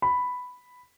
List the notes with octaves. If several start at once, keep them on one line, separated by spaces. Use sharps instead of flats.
B5